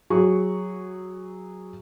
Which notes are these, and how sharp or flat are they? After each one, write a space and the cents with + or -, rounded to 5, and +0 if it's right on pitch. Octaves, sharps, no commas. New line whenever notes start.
F#3 +0 G#4 -15 C#6 +0